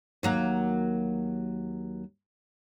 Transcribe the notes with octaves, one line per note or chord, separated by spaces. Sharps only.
D#2 F#3 A#3